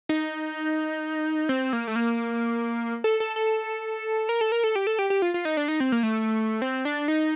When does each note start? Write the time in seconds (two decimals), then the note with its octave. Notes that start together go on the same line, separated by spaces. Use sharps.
0.09 D#4
1.49 C4
1.73 A#3
1.87 A3
1.96 A#3
3.04 A4
3.20 A4
3.36 A4
4.29 A#4
4.41 A4
4.52 A#4
4.64 A4
4.76 G4
4.87 A4
4.99 G4
5.10 G4
5.22 F4
5.34 F4
5.45 D#4
5.57 D4
5.68 D#4
5.80 C4
5.92 A#3
6.03 A3
6.62 C4
6.85 D4
7.08 D#4